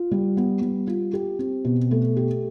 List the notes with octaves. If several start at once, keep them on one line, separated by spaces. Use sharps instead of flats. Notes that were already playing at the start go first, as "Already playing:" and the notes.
Already playing: F4
G3
B3
G3
F4
G4
C4
B2
A3
G4